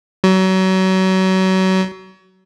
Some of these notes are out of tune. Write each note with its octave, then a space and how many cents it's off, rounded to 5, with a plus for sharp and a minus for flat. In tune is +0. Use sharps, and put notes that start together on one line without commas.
F#3 +30